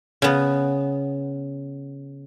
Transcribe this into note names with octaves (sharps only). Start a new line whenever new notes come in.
C#3 B3